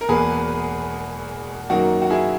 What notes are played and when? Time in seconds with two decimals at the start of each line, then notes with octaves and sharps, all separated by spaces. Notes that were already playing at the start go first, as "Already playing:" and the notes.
0.01 A#4
0.09 E1 E2 B2 A#3 G#4 B4
1.70 F#2 D#3 A#3 F#4 A#4
2.02 F#4
2.10 E4 G#4